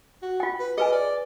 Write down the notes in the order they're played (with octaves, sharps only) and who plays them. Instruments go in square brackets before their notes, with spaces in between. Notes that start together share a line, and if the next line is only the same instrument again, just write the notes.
[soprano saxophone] F#4
[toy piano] F4 G5
[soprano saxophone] B4
[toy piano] G#4 B4 G#5 [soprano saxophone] D#5
[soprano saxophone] D5